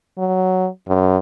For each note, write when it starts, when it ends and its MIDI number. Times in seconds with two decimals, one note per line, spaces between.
0.18 0.68 54
0.88 1.17 42